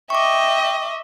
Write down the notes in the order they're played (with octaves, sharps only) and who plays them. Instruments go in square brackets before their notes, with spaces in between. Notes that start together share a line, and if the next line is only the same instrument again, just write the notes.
[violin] D#5 E5 [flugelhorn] G5 [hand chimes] C#6 D6